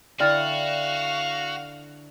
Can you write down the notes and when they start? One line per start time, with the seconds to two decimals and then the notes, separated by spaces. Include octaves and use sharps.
0.20 D3 E4 F#4 D5 F5 G5 F6 A6